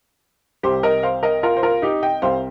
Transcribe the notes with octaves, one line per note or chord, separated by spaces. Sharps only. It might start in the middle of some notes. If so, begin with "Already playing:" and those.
C2 C3 G3 G4 C5
A#4 D#5
C5 F5
A#4 D#5
F4 A#4
C5
F4 A#4
D#4 G4
D#5 G5
C2 C3 G3 C5 F5